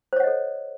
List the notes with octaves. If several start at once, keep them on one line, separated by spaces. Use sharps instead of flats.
A4 C5 C#5 D#5 F#5